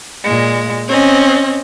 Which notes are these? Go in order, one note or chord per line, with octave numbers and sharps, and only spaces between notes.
A#2 G#3
C4 C#4 D#5